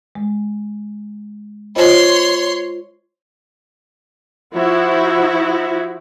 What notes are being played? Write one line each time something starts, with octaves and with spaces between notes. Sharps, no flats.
G#3
F4 C5 C#5 D#5 C6
F3 E4 F#4